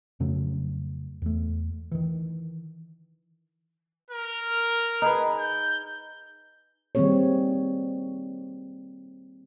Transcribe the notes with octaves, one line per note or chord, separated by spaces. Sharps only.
F2 C#3 F#3 A3
E2 A3
D#3 E3
A#4
D#4 G#4 B4
G6
D#3 G3 A#3 C4 G#4 C#5